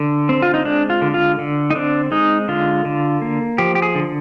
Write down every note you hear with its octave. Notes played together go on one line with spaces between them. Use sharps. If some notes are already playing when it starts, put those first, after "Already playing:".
Already playing: D3
C4
F4
D#4
G#3 D4
F4
D3
F4
D3
D#4
C4 D4
G#3 D#4
D3 F4
D3
A#3
F3 G4
G4
G#4
D3